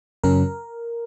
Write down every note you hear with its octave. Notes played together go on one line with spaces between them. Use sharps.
F#2 C#3 F#3 C#4 A#4